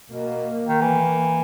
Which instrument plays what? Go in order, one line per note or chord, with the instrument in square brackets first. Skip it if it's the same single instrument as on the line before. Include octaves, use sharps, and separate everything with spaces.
[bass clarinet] B2 [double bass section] A#3
[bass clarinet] D#3
E3
[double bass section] A#3